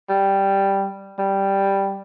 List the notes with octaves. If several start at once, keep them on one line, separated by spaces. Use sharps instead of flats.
G3
G3